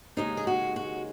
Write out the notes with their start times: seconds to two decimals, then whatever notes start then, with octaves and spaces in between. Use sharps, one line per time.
0.17 D#2 C#3 G#3 D#4
0.37 G#4
0.47 F#4
0.76 F#4